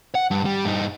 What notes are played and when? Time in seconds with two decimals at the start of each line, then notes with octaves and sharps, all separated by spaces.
0.15 F#5
0.31 G2
0.45 G3
0.65 G2 D#4